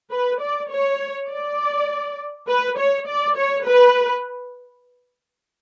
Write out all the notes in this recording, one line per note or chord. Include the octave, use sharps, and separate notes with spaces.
B4
D5
C#5
D5
B4
C#5
D5
C#5
B4